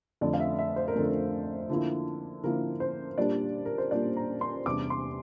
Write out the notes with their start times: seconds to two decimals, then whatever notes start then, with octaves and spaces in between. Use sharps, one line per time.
0.21 F2 D3 A3 D5
0.33 F5
0.40 E5
0.59 E5
0.76 C5
0.88 A#4
0.95 F2 D3 A3 A4
1.09 A#4
1.70 D3 F3 A#3 E4
2.43 D3 F3 A#3 E4 A#4
2.80 C5
3.18 A#2 G3 D4 D5
3.66 A#4
3.78 C5
3.91 A#2 G3 D4 D5
4.17 A#5
4.41 C6
4.66 E2 C3 G3 D4 D6
4.90 C6